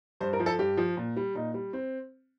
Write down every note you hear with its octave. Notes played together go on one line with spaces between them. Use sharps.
G2 C5
A#4
F3
A4
G2 G4
F3
A#2
G3
A#2 D#4
G3
C4